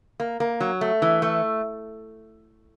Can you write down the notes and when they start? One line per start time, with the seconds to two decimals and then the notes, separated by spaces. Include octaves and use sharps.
0.20 A#3
0.40 A#3
0.60 F#3
0.81 A3
1.02 E3
1.22 A3